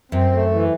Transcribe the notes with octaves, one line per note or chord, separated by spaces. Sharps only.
F#2 C4
A3
E3